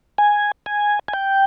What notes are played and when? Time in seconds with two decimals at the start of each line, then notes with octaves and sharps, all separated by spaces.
0.18 G#5
0.66 G#5
1.08 G#5
1.13 G5